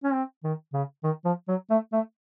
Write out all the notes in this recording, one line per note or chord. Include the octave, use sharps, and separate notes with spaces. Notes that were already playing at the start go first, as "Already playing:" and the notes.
C#4
C4
D#3
C#3
D#3
F3
F#3
A3
A3